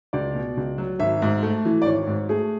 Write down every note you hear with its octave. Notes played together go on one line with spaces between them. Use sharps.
C#2 D5
B2
C#2
F#3
G#1 E5
G#2
A3
E3
D5
G#1 C#5
G#2
A3 G#4